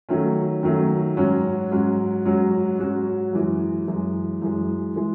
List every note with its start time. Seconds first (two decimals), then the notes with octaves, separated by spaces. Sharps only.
0.09 D#3 F#3 A3 C#4
0.63 D#3 F#3 A3 C#4
1.17 G#2 F#3 C#4 F#4
1.71 G#2 F#3 C#4 F#4
2.25 G#2 F#3 C#4 F#4
2.79 G#2 F#3 C#4 F#4
3.33 F#2 E3 G#3
3.88 F#2 E3 G#3
4.42 F#2 E3 G#3
4.96 E3 G#3